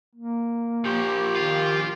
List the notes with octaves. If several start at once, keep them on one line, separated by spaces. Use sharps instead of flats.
A#3
A#2 F3 G4
D#3 F4